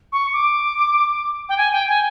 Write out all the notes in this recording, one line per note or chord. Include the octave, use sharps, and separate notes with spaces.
C#6
D6
G5
G#5
G5
G#5